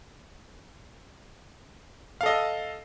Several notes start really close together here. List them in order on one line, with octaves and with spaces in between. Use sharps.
F5 A4 D#5